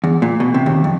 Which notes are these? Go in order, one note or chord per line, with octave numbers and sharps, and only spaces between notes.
E2
A#2
B2
C3
D#2
F2